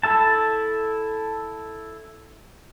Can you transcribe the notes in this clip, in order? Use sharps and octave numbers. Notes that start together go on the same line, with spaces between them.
E4 A4 E5 A5